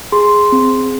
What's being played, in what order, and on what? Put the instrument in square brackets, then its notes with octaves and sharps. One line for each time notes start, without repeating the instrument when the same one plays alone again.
[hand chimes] G#4 C6
C4